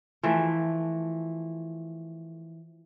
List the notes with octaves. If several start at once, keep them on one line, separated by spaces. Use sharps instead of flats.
E3 F3 A3